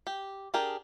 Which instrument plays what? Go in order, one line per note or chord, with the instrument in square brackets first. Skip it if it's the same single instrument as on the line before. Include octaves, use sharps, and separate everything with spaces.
[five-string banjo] G4
D4 G4 G#4 A#4